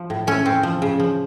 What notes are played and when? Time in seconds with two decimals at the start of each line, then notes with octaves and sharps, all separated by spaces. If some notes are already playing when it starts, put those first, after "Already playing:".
Already playing: F3
0.10 A2
0.27 A3 C#4
0.46 C4
0.63 F3
0.82 C#3
1.00 F3